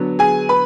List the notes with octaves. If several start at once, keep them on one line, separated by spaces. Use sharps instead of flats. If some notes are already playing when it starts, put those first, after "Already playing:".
Already playing: D3 F#3 B3
G#4 G#5
B4 B5